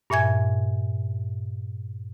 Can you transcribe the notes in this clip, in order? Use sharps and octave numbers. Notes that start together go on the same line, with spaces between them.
G2 A#2 E5 G#5 G#6